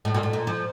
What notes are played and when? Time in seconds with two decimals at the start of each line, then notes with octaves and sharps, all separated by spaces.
0.05 A2
0.14 A#2
0.23 A2
0.33 A#2
0.47 F3